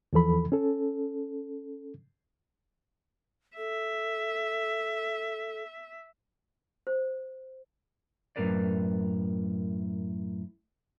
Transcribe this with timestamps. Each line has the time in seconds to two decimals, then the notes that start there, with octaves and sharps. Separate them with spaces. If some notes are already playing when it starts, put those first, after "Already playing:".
0.13 E2 E3 F3 A4 B5
0.52 C#4 A4
3.58 A4 E5
6.87 C5
8.36 F#2 A2 C4 A#4 B4 D5